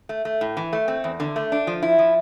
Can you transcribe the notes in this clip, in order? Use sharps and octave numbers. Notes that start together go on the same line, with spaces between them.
A3
A3
A2
E3
A3
C4
E2
D3
A3
D4
F3
E4
F3